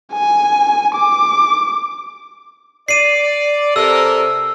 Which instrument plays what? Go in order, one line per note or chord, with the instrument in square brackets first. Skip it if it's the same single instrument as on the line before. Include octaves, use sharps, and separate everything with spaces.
[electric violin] G#5
D6
[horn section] D5 [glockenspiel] C7 D#7
[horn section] C3 A4 A#4 [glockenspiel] E6